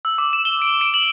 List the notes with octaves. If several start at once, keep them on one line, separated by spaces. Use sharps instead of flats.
E6
D6
E7
G7
D7
D7
F#7